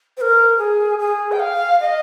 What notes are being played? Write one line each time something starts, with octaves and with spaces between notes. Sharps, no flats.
C5
A#4
G#4
G#4
G5
F5
D#5